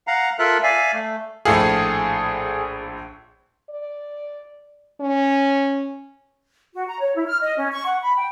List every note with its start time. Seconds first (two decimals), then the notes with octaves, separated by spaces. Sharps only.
0.07 F5 F#5 A#5
0.39 F4 A4 A#4 E5 F#6
0.63 D5 E5 F5 G#5
0.93 A3
1.45 A#1 A2 G#4 A4 F5
3.70 D5
5.01 C#4
6.74 F#4
6.88 A#5
7.01 C#5
7.15 E4
7.27 F6
7.42 D#5
7.58 C#4
7.72 C#6
7.86 F#5
8.01 B5
8.17 G5